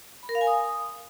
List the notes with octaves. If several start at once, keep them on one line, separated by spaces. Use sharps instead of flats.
B5
A#4
F5
G#5
D#6